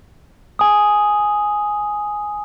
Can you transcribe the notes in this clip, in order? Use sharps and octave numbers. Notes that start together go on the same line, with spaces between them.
G#5 D#6